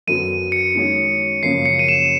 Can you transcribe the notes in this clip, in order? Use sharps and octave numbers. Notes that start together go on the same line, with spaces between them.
F#2 D3 F#3 B3 D#7
C#7
D#3 G#3 C#4 F#4
F#2 C#3 F3 A#3 C#4 C7
C#7
D#7
E7